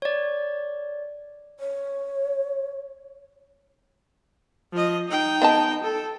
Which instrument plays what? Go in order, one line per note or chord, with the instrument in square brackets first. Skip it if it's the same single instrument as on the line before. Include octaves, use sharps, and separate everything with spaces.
[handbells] C#5 D5
[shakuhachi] C#5
[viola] F3 D#5
D#4 G5
[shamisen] B3 D#5 A5
[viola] A4